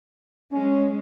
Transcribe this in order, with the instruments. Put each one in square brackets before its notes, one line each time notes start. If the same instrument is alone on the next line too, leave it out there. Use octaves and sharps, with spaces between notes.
[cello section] G#3 [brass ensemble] C#4